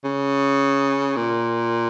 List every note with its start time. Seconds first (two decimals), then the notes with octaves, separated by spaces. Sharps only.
0.04 C#3
1.16 A#2